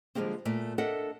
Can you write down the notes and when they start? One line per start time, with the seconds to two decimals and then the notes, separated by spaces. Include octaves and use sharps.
0.15 D3 F3 G3 G#3 A#3 C4
0.45 A#2 A3 A#3
0.78 D4 A4 A#4 D#5 E5 F#5